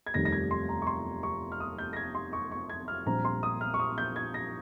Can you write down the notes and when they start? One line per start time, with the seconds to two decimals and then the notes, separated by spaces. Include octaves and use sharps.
0.06 G#6
0.14 F1 D#2 D#3 G3 A#6
0.25 A#6
0.33 G#6
0.51 C6
0.69 A#5
0.82 C#6
0.87 C6
1.23 C#6
1.52 F6
1.60 D#6
1.78 G6
1.93 A#6
1.96 G#6
2.15 C6
2.33 C#6
2.52 C#6
2.70 G#6
2.88 F6
3.06 A#1 A#2 G3 C4 A#5
3.25 C6
3.43 D#6
3.61 F6
3.74 C#6
3.79 D#6
3.98 G6
4.16 G#6
4.34 A#6